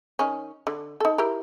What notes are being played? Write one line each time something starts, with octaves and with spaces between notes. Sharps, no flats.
D#3 C#4
D3
D#4 A4
E4 G4 A#4